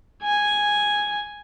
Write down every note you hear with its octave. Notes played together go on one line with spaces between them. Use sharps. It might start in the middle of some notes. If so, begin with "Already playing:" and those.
G#5